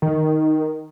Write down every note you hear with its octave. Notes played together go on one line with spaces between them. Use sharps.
D#3